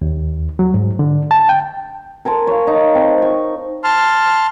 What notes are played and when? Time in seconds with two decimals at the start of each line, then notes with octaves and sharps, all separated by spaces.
0.02 D#2
0.59 F#3
0.74 G#2
0.99 D3
1.31 A5
1.49 G5
2.25 A#4 G#5 A5 C6
2.47 C#5 F5
2.67 D#4
2.95 C4
3.22 C#6
3.84 A5 C6 F6